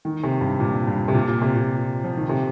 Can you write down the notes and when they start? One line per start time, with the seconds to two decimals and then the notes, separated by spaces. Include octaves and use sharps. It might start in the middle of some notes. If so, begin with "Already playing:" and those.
0.05 D#3
0.24 C3
0.41 G2
0.60 A#2
0.87 G2
1.08 C3
1.14 A#2
1.28 A#2
1.42 C3
1.56 A#2
2.04 F3
2.17 D#3
2.29 C3